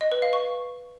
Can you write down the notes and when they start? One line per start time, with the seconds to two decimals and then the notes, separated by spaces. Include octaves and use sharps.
0.01 D#5
0.12 B4
0.22 F5
0.33 C#6